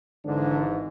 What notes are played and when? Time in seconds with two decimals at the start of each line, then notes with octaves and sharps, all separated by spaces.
0.25 G#1 G#2 D3 E3 D4